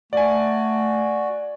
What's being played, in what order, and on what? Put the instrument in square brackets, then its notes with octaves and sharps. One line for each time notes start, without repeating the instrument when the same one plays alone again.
[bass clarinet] A3 [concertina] F#4 [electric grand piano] D5 G#5